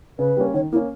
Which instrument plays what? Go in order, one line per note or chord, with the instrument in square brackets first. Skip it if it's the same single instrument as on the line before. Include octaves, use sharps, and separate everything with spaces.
[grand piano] C#3 [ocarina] B4
[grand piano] G3 A#3 C#4
[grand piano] D#3 [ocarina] C#5
[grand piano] A#3 C#4 [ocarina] E4